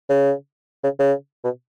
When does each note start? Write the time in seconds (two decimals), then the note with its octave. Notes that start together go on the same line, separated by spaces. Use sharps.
0.09 C#3
0.83 C#3
0.99 C#3
1.44 B2